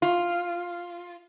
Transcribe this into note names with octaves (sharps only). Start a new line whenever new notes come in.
F4